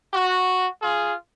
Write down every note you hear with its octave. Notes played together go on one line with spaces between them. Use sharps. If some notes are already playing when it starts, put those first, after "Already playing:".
F#4
F4 G#4